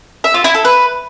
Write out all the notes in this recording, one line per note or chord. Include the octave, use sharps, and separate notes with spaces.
E5
F4
E4
A4
B4